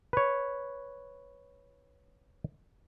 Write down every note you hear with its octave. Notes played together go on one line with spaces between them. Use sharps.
B4 C#5